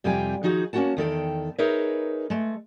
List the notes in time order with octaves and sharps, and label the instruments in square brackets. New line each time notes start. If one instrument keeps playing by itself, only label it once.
[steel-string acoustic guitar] F2 C3 G3 F5 G5 G#5
D#3 F3 D#4 F#4 G#4
A#3 C#4 F4 F#4 F#5 A5
E2 D#3 A4 G5
D#4 G#4 A#4 B4 C#5 E5
G#3 A3